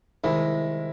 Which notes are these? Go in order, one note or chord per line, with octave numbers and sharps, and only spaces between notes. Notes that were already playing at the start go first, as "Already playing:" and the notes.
C2 C3 D#3 G#3 E4